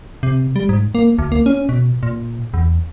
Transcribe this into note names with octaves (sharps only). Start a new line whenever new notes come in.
C3
G3
G#2
A#3
D2
A#3
C#4
B2
A#2
E2